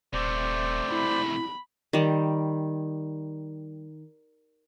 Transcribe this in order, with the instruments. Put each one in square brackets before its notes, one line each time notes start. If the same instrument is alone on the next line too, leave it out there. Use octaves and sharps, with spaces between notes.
[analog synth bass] D#1 [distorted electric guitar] C3 A3 [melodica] C5 D5
[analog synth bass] E4 [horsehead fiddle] B5
[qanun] D#3 G3